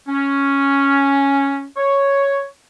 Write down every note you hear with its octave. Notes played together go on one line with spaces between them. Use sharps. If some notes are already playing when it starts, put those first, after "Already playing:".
C#4
C#5